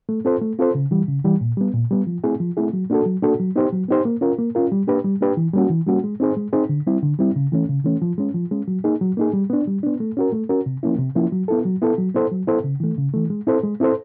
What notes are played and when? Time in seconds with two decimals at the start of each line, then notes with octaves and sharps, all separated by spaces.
0.09 A3
0.25 C4 F4 A4 C5
0.42 A3
0.59 C4 F4 A4 C5
0.75 C#3
0.91 E3 G3
1.08 C#3
1.24 E3 G3
1.41 A#2
1.57 G3 B3
1.74 A#2
1.91 G3 B3
2.07 F3
2.24 A3 C4 E4 G#4
2.40 F3
2.57 A3 C4 E4 G#4
2.73 F#3
2.90 A#3 D4 F#4 A4
3.06 F#3
3.22 A#3 D4 F#4 A4
3.40 F#3
3.56 B3 D#4 G4 C5
3.73 F#3
3.88 B3 D#4 G4 C5
4.05 A#3
4.21 C#4 F4 A#4
4.39 A#3
4.55 C#4 F4 A#4
4.72 G3
4.87 A#3 D4 G4 B4
5.05 G3
5.21 A#3 D4 G4 B4
5.37 E3
5.53 G3 A#3 C#4 F#4
5.70 E3
5.87 G3 A#3 C#4 F#4
6.04 G#3
6.20 C4 D#4 G#4 C5
6.37 G#3
6.53 C4 D#4 G#4 C5
6.69 D3
6.87 G3 C4 E4
7.03 D3
7.19 G3 C4 E4
7.36 C#3
7.52 E3 A3 C#4
7.69 C#3
7.85 E3 A3 C#4
8.02 F3
8.18 G#3 C#4
8.34 F3
8.51 G#3 C#4
8.68 F#3
8.84 A#3 D#4 G#4
9.01 F#3
9.17 A#3 D#4 G#4
9.33 G3
9.50 B3 D4
9.67 G3
9.83 B3 D4
10.00 A3
10.17 C#4 F#4 A#4
10.33 A3
10.49 C#4 F#4 A#4
10.66 C3
10.83 F3 A#3 C#4 E4
10.99 C3
11.15 F3 A#3 C#4 E4
11.32 F#3
11.48 B3 E4 A4
11.65 F#3
11.82 B3 E4 A4
11.98 F#3
12.15 B3 E4 A4 C5
12.32 F#3
12.47 B3 E4 A4 C5
12.64 C#3
12.80 E3 A3
12.98 C#3
13.14 E3 A3
13.30 G#3
13.47 C4 E4 A4 C5
13.64 G#3
13.80 C4 E4 A4 C5